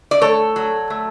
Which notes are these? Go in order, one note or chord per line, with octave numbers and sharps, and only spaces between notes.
D5
A3 A4 C#5
F#3
A3